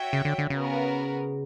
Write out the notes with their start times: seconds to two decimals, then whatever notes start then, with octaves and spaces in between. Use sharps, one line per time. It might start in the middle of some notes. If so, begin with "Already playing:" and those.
Already playing: F#4 C#5 E5 G5
0.13 C#3
0.25 D3
0.38 D3
0.50 C#3 B3 F#4 A#4